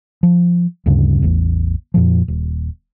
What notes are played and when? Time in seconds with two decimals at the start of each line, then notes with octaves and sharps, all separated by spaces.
0.23 F3
0.86 D2 G2 C#3
1.22 A1 E2
1.94 F2 A#2 F3
2.28 D#1